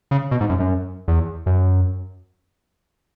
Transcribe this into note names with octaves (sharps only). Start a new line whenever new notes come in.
C#3
B2
G#2
F#2
F#2
E2
F#2